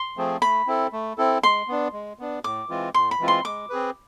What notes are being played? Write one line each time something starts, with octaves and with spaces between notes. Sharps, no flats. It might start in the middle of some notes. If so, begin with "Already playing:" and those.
Already playing: C6
F3 A3 C4 G#4
A3 B5
C4 E4 A4
A3
C4 E4 A4
G#3 C6
B3 D4
G#3
B3 D4
A2 D6
E3 G#3 C4 F4
A2 C6
B5
E3 G#3 C4 F4
C6
G#3 D6
C4 G#4 B4